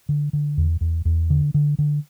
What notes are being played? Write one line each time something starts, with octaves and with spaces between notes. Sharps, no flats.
D3
D3
E2
E2
E2
D3
D3
D3